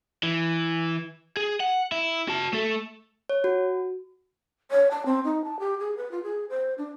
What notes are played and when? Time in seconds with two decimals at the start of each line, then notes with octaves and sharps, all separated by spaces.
0.23 E3
1.37 G#4
1.60 F#5
1.92 E4
2.28 F#4 A5
2.53 A3 A4
3.29 C#5
3.44 F#4
4.71 C#5
4.91 A5
5.06 C4
5.24 D#4
5.44 A5
5.59 G4
5.79 G#4
5.97 B4
6.11 F4
6.23 G#4
6.50 C5
6.78 D4